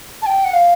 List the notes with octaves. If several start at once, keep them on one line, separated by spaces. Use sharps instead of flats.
A5
G5
F#5
F5